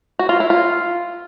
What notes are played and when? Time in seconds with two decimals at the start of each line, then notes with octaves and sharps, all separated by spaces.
0.19 F#4
0.29 F4
0.40 E4
0.50 F4